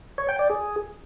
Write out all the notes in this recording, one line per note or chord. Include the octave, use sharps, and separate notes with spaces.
C#5
G5
D5
G#4